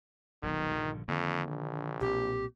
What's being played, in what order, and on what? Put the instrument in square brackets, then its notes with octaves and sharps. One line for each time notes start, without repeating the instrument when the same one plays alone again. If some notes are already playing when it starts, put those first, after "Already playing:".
[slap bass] D#1 B1 [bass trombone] D#3
[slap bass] A#1 G2 D3
[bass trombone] F2 [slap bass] D3 D#3 A#3
[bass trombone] A#1
[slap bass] B1 A#2 C4 [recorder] G4